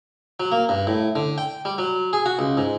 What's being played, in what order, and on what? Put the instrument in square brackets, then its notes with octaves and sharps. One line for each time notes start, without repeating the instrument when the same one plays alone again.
[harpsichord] F#3
A#3
G2
A2
D3
G5
G3
F#3
G#4
F#4
C#2
G#2